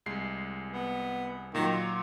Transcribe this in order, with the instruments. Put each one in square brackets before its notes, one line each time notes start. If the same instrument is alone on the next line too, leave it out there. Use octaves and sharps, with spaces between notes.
[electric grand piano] C2 G#3 C7
[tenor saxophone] B3
[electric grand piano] A#2 F#3 [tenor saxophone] D#3
[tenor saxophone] F4